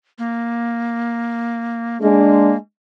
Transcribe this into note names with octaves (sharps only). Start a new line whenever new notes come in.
A#3
G#3 A#3 D4